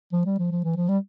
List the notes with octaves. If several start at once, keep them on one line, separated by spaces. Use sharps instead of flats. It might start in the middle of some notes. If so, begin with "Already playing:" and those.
F3
G3
F3
F3
E3
F3
G3